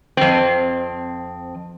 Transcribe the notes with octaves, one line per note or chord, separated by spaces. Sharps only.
F2 C4